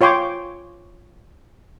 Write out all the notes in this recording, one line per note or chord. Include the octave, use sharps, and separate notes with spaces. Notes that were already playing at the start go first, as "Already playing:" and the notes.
F4 C#5 G5 C6 D6